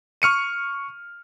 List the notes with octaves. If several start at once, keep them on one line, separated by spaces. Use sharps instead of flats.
C#6 F6 C#7 D#7